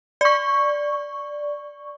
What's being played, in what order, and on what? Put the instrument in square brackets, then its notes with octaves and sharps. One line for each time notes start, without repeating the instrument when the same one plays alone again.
[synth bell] D5 C#6